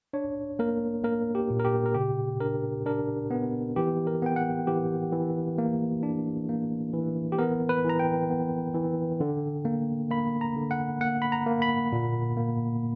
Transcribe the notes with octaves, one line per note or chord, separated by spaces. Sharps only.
D4 C#5
A#3 A#4
A#3 A#4
G4
A#2
A#4
G4
A#4
C#3 G4
D4 A#4
D4 A#4
B3
E3 G4
A#4
B3 G5
F#5
E3 G4
E3
A#3
D4
A#3
E3
G4
B3 A#4
B4
E3 A#5
G5
B3
E3
D3
A#3
A#3 B5
A#5
D3
F#5
A#3 F#5
B5
A#5
A#3
B5
A#2
A#3